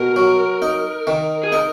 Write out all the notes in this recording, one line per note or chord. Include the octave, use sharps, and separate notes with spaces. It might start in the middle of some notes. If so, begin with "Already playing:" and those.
Already playing: B2 A#4
F#3
D#4
D#3
G#4
D#4 A#4